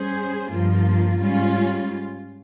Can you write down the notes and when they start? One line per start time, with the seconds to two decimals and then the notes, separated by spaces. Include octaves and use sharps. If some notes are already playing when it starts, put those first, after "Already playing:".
Already playing: G3 C#4 G#4 C5
0.50 G2 F3 A#3 F4
1.21 G#2 G3 C#4 F4